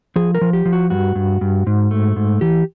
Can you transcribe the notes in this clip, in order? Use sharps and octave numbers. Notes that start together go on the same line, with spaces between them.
F3 G#4
A#4
F3
G4
F3
F#4
G2 F#4
G2
G2
G#2
A3
G#2
E3 G4